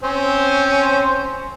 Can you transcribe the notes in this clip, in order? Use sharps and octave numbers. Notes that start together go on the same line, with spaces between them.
C4 C#4 C5